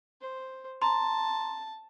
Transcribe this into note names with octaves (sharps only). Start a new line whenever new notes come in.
C5
A5 A#5 C6